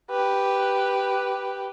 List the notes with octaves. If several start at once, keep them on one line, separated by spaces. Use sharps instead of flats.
G4 B4